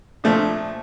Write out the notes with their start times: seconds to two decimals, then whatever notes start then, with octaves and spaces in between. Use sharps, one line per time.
0.24 A#2 F3 A3 D4